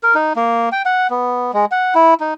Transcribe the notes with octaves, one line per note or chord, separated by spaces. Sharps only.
A#4
D#4
A#3
G5
F#5
B3
G#3
F#5
E4
D#4